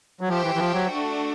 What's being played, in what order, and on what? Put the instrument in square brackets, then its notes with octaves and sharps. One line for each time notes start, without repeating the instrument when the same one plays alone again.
[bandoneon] F#3
[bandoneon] F3 [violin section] G4 C5 E5 G5
[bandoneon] E3
E3
F3
F#3
[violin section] A3 D4 F#4